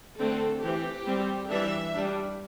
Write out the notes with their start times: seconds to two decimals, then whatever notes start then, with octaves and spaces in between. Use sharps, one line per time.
0.18 D3 A3 C4 A4
0.62 E3 C4 G4
1.06 G3 C4
1.50 E3 G3 D4 E5
1.94 G3 D4